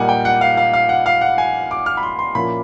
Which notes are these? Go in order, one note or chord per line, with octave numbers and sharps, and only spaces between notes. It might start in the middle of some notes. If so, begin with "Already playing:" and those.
Already playing: A#2 G3 A#3 D#4 F#5 G#5
G5
F#5
F5
F5
F5
F#5
F5
F#5
G#5
D6
F6
B5
C6
C6
A#2 F3 A#3 C#4 E4 B5